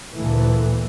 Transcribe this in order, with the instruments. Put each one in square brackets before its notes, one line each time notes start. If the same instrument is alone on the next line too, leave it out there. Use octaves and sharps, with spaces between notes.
[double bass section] D2 A#2 E3 A3